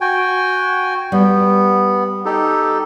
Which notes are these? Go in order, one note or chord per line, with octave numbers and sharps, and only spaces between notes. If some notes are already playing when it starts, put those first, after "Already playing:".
F#4 G5 G#5
G3 B3
D#4 G4 A4